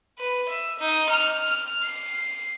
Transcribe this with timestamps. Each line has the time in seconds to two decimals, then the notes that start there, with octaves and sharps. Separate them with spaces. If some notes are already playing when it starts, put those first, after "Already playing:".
0.19 B4
0.49 E5
0.80 D#4
1.09 F6
1.50 F6
1.83 C7